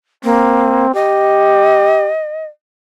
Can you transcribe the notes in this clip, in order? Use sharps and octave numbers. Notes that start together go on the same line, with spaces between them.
A#3 C4
G4 D#5